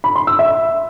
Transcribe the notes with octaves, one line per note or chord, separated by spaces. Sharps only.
B5
C6
E6
E5